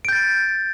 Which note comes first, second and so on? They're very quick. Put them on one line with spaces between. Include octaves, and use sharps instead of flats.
D7 G6 A6